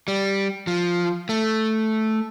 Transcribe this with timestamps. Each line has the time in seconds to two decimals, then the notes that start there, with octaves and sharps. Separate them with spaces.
0.08 G3
0.67 F3
1.29 A3